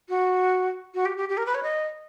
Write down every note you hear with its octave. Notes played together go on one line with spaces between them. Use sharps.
F#4
F#4
G4
G4
G4
A#4
B4
C#5
D#5